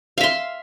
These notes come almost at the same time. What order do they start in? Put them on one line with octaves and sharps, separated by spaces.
F5 E5 C6